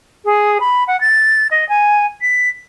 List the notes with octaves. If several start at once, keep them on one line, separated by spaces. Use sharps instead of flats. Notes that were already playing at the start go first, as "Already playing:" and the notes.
G#4
B5
F#5
A6
D#5
G#5
B6